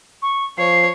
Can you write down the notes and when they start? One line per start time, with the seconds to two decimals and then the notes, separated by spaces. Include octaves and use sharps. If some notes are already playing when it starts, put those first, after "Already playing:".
0.22 C#6
0.58 F3 C#5 C7